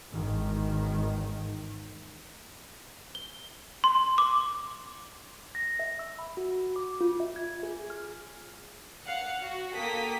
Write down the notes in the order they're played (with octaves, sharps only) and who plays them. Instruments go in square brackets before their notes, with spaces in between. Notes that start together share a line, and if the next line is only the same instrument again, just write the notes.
[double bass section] G#1 E2 D#3
[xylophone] G7
C6
D6
[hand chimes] A#6
E5
E6
B5
F#4
D6
F4
E5
G#6
G#4
G#4
F6
[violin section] F5 F#5 C#7
F#4
A#3 A4 G5 D#6 B6